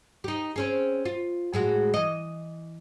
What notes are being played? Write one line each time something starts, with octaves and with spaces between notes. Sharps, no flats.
D#4 G4
C4 C#4 G#4
F4
A2 G#3 F#4
E3 D#5